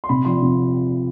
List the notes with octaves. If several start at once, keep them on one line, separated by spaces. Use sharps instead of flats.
C6
C3 B5
F3 C6
C3